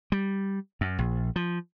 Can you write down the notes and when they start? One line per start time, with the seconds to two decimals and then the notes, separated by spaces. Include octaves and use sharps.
0.12 G3
0.81 F#2
0.99 A#1
1.36 F3